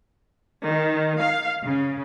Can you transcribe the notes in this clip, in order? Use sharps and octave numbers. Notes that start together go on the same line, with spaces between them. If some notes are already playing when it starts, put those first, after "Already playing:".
D#3
F5
C#3